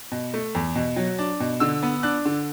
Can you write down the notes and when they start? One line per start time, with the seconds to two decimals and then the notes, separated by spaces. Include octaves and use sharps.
0.12 B2
0.34 A3
0.55 E2
0.75 B2
0.96 F#3
1.19 D4
1.40 B2
1.60 D3 E6
1.83 B3
2.03 D4 F#6
2.25 D3